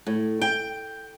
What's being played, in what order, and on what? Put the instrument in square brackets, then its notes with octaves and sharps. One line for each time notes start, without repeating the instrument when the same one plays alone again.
[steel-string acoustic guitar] A2
G5